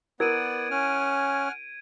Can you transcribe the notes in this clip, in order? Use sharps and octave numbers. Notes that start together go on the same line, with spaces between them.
B3 E4 A#4 D5 F#5 G#6 D7 D#7
C#4 F#5 G#5 F6